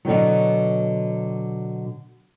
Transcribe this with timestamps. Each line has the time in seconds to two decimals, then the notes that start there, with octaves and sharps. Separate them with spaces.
0.05 B2 D3 D#3 F#3